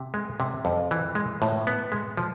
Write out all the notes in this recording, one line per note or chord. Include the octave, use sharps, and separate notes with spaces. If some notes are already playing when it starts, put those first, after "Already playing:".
Already playing: C3
G#3
C3
F2
E3
G#3
A2
B3
G#3
F3